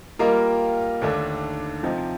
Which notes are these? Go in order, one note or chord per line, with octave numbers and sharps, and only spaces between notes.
G3 A#3 F4 A#4 D#5
D#2 D3 A3 D4
C3 F3 C4 D#4